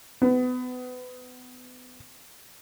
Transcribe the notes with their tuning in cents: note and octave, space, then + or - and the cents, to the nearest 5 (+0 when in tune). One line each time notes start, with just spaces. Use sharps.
B3 +30